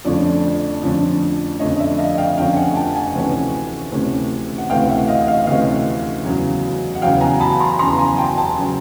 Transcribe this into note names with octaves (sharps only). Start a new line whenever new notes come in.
F2 D3 F3 A3 C#4 D5
F2 D3 F3 A3 C#4
F2 D3 F3 A3 C#4 D#5
D5 E5
D#5 F5
F5 G5
F2 D3 F3 A3 C#4 F5 G5
F#5 G#5
G5 A5
F#5 G#5
D2 C3 E3 A3 C#4
D2 C3 E3 A3 C#4
F#5
D2 C3 E3 A3 C#4 F5 G5
E5 F#5
D#5 F5
D#5 F5
D2 C3 E3 A3 C#4 D#5 F5
E2 C#3 F#3
F#5
E2 C#3 F#3 F5 G5
G#5 A#5
A5 B5
A#5 C6
E2 C#3 F#3 A#5 C6
G#5 A#5
G5 A5
G5 A5
C#3 F#3